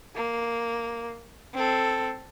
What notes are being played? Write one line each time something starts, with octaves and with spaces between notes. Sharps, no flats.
A#3
C4 A4